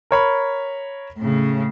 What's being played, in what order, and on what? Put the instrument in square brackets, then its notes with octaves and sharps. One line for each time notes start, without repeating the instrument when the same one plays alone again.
[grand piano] A#4 C#5 B5
[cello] A2 C#3